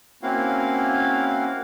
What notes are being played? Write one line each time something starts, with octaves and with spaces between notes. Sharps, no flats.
A#3 C4 C#4 E4 F#4 F5